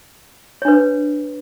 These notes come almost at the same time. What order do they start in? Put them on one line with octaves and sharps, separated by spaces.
C#5 D4 B4